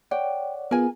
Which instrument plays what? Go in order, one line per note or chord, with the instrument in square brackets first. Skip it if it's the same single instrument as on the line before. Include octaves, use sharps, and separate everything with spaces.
[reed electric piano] C#5 D5 F#5 [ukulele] G5
[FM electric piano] B3 F4 G#4 [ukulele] A#4 G#5